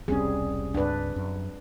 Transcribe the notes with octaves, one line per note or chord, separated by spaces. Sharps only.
E1 C2 G3 C4 C#4 G#4
C#2 G2 D4 B4
F#2